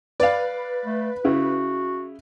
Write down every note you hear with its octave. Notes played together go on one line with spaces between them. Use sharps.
B4 D5 F5
A3
C#3 E4 F#4